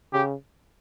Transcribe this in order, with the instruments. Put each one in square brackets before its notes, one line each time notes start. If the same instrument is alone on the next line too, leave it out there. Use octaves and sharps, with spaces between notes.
[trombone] C#3 [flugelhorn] G4